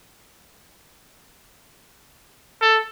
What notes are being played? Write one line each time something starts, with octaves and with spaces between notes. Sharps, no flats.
A4